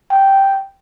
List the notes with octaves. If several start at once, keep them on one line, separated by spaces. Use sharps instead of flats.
G5